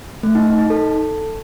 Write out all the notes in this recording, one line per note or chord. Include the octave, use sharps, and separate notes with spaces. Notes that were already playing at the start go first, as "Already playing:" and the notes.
A3
D#4
D#4
D#4
A4